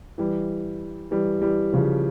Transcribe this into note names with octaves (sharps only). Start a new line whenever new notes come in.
E3 G3
E3 G3
E3 G3
C#3 F3